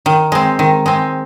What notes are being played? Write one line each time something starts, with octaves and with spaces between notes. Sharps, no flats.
D#3
G#3 C4
D#3
G#3 C4